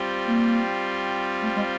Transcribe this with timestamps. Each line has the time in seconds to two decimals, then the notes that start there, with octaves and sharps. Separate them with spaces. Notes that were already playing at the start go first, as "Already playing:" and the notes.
Already playing: G3 C4 F4
0.27 A#3
1.42 A3
1.56 G#3